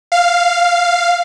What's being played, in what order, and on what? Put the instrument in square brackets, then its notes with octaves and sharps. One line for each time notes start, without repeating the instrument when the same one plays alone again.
[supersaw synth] F5